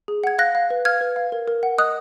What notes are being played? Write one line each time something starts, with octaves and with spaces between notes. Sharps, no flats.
G#4
F#5 G#6
F5 F#6 A#6
F5
B4
F5 F6 G#6
B4
F5
A#4
A#4
F#5
D#5 D#6 F#6